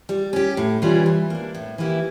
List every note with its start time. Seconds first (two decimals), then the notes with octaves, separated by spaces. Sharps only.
0.09 G3
0.33 C#4 G4
0.57 A2
0.82 E3 G3 C#4 F4
1.06 E3
1.30 A#3 D4
1.55 A2
1.78 E3 A#3 E4 G4